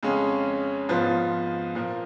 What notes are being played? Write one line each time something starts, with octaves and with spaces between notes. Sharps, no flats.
F2 C#3 G#3 C#4
G#2 F3 B3 F4
A#2 F3 A#3